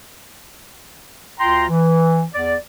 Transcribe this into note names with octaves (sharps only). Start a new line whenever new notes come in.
D2 F4 G5 A#5 C6
E3
E2 D5